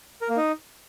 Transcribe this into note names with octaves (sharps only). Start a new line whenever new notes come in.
A#4
A#3
D#4